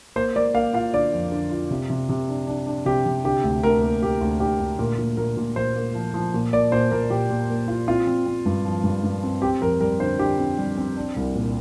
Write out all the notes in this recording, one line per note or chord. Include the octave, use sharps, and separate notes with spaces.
A#3 C5
A#3 D5
A#3 F5
F4 F5
D3 D5
F2
D3
F4
C3
C3
C3
D4
D4
D4
C3 G4
C3
D3 G4
D2
D2 A#4
A#3
A#3 G4
D2
D3 G4
D2
A#2 A#4
A#2
A#2 A#4
A#2
A#2 C5
A#3
F3
F3
A#2
A#3 D5
A#2 C5
A#2 A#4
A#2 G4
A#2
A#3
F4
C4 F4
C4
C4
G2
F3
G2
G2
C4
C4 G4
F2 A#4
G3 A#4
D3 C5
D3 G4
C4
G3
C4
D4
C2
A#2